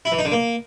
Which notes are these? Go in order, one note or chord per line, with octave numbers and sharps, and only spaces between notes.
E4
E3
D#4
D3
A#3